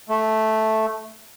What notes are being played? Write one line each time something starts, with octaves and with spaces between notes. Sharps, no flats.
A3